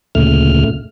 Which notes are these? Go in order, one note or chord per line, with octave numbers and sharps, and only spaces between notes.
D2 A#2 C#3 A3 F6